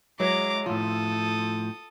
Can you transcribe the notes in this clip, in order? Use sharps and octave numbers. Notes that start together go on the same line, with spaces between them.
F#3 G#3 E4 B4 A#5 D6
A2 F3 F4 A4 D#6